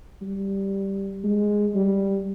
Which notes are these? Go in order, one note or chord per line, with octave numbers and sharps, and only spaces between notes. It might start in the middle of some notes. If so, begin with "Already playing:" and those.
G3
G#3
G3